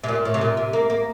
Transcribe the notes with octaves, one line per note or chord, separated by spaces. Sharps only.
C3
A#2
A2
C3
A#2
C3
A#3
A#3